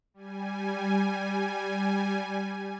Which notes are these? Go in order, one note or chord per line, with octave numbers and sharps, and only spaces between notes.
G3 G#5